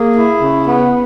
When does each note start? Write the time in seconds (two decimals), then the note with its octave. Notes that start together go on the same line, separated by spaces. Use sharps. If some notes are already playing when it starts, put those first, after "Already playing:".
Already playing: A#3 G#4
0.14 E4
0.41 C#3
0.66 B3